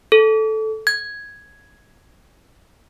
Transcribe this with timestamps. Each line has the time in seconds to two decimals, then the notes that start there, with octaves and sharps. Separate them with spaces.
0.12 A4
0.87 G#6